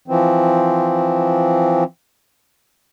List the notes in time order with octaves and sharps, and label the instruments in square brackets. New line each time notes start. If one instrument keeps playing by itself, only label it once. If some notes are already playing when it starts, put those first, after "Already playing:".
[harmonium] E3 F3 C4